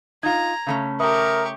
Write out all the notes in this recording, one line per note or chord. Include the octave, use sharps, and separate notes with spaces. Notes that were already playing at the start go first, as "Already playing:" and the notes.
D#4 F4 A#5 G#6
C#3 A3 C#4
G4 A#4 E5 C#6 D#6